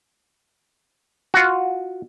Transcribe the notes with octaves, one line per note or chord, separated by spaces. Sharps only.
F4 F#4